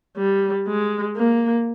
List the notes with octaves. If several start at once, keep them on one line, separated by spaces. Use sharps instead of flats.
G3
G#3
A#3